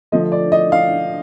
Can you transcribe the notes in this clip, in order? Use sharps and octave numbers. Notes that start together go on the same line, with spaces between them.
D3 F3 A3 D#5
D5
D#5
F5